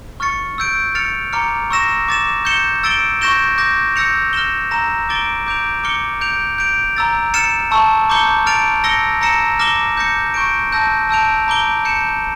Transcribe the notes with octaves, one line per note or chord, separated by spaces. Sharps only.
C#6 F6 A6 C#7
E6 G6 D7
F6 A6 C#7 F7
A#5 D6 F6 C#7
C#6 E6 A#6 E7
D6 A6 E7
G6 C#7 E7 G7
E6 A6 D7 G7
C#6 G6 A#6 E7 G7
D6 G6 A#6
E6 G6 A#6 C#7 F7
F6 A#6 E7 G7
A#5 E6 A#6 E7
D6 A6 D7 G7
D6 G6 D7 F7
D6 F6 C#7 G7
G6 D7 F7
G6 D7 F7
A#5 E6 A6
F6 A6 C#7 E7
A5 C#6 E6
A#5 D6 G6 C#7 G7
F6 A6 D7 F7
E6 A#6 C#7 G7
A#5 E6 A#6 C#7 E7
D6 F6 A#6 E7 G7
D6 G6 A#6 C#7
C#6 G6 D7
A5 E6 G6 A#6
A5 E6 G6 D7 F7
A#5 D6 G6 D7 G7
G6 C#7 E7